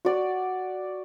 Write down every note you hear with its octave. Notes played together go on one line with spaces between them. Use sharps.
F#4 D5